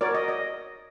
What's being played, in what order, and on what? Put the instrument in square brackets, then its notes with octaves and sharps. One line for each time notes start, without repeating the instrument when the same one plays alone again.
[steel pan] F#4 A#4 C#5 D5
D#5
D#5